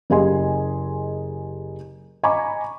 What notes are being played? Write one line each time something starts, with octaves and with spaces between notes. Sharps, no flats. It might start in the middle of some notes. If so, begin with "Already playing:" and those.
F#1 G4 G#4 D#5 G#5 C6
D#5 G#5 A#5 B5 C#6 D6